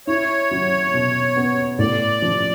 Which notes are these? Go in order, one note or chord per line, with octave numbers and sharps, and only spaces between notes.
E4 C#5
F#3
B2
B3
A2 D5
F3